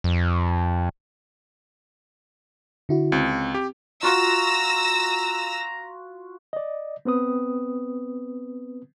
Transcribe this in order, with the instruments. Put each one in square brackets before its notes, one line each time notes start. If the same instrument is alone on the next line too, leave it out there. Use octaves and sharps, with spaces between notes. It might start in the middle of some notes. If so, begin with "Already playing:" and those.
[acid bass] F2
[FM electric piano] D3 E4 F#4
[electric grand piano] C#2 [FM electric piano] C4
[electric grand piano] G4
[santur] F4 F#4 [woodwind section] A#5 [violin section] E6 A#6
[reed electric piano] D5 D#5
B3 C4 B4 D#6